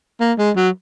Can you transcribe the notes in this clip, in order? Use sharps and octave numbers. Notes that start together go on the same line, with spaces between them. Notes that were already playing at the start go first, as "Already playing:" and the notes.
A#3
G#3
F#3